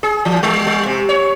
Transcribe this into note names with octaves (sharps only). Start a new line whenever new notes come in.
G#4
E3
G3
G3
C3
C#5